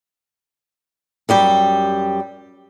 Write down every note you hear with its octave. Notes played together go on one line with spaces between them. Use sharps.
F#2 G3 G4